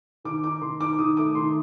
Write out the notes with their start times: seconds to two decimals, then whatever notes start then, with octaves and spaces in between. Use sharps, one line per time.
0.24 D#3 D6
0.43 D#4 D6
0.61 D#3 C6
0.80 D#4 D6
0.98 D#3 D#6
1.17 A3 D6
1.35 D#3 C6